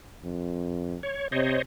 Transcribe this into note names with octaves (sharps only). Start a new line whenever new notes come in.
F2
C#5
C3 C5 C#5 D#5